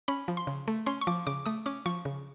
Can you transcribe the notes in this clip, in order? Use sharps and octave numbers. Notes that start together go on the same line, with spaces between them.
C#4 B5
F3
C6
C#3
A3
C#4 C6
C#6
F3 D6
C#3 D6
A3 D#6
C#4 D6
F3 C#6
C#3